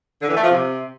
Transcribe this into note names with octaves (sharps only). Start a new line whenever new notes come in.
D3
E3
A3
F3
C3